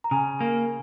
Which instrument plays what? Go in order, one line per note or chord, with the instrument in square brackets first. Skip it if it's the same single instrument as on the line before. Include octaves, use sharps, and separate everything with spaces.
[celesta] A#5
[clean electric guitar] C#3 [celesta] G#5
[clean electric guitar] A#3